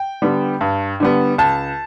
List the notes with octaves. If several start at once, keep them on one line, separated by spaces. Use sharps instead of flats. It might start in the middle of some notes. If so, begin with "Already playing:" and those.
Already playing: G5
D3 G3 B3
G2
D3 G3 B3
C#2 A5